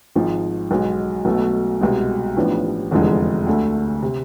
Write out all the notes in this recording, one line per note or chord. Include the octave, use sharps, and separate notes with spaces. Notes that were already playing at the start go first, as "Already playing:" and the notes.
G#1 G#2 F3
B1 B2 G#3
B1 B2 A3
C2 B2 G#3
A1 A2 F3 B3 D4
F1 E2 D3 F3 G#3
D2 D3 A3
C3